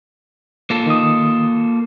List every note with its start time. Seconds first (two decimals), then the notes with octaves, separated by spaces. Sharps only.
0.70 A#3 F4 A4
0.86 D#3 D#6